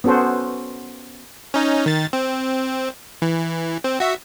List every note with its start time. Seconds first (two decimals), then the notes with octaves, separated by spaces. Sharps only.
0.04 B3 C#4 F#4 A4 C5
1.54 C#4 D#4
1.86 D#3 A6
2.13 C4
3.22 E3
3.84 C4
4.00 F#4 E5